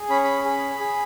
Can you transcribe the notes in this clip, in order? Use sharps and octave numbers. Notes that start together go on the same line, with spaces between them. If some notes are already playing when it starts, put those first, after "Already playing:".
Already playing: G#4
C#4 B5
B5
G#4
G#4